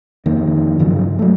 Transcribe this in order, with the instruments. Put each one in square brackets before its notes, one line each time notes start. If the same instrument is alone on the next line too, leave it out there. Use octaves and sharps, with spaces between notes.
[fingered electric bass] F2 D#3 A#3
G2 C#3 F3 F#3
F#3 A3